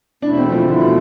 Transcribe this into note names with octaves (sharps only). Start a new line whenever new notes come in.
E2 B2 A3 D4 E4
C4
F3
E2 B2 D3 A3 E4